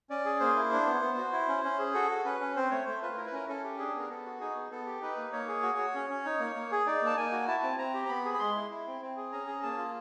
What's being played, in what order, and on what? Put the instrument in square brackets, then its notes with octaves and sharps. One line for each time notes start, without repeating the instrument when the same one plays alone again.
[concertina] C#4 D5
G#4
A#3 C5
E4
D4
B3
B3
F#4
E4
C#4
C#4
G#4
F#4 A4
F#4
C#4 B4
C#4
C4 C5
A3 C#5
A3 C5
F4 B4
E4 A#4
B4
C#4 A#4
C#4 A4
G4
D4 G#4
B3 A#4
B3 A4
F#4
D#4 G#4
B3
B3 A4
G4
D#4 B4
A#3
A#3 C#5
G#4
F#4
F#4
C#4
C#4
D#4
A#3
A#3
G#4
D#4 D5
A#3 A5
A#3 G#5
F#4
E4 A5
C4
C4 A#5
G4
A#5
B3 B5
G#4
B5
G#3 C6
E4
E4
C4
C4
G#4
C#4 A#5
G#4
A#3 A5
F4